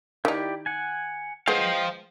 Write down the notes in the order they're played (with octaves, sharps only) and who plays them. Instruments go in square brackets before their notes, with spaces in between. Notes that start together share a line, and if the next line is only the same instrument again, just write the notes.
[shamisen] D#3 D#4 [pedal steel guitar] E4 G4 D5
[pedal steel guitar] F#5 G#5
[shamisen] G#3 B3 [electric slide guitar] C5 F5 [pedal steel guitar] D#5 G5